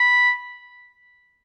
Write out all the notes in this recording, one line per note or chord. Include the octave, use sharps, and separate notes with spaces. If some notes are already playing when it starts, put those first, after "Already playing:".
Already playing: B5